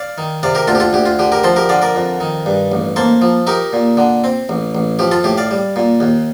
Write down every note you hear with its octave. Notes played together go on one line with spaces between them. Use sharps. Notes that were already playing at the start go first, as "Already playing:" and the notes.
Already playing: D5 F5
D#3
C3 D5 F5
G4 A#4
D2 F4 A4
G4
F4 A4
D2 G4
F4
D3 G4
G4 A#4
F3 A4 C5
G4 A#4
D3 D5 F5
A#4 D5
F2
D#3
G2
A1
A#3 A4 C5
F3
D#4 G4 A#4
A#2
D3
C4
A1
A1
F3 G4
F4 A4
A2 G4
D5 F5
G3
A#2
D#2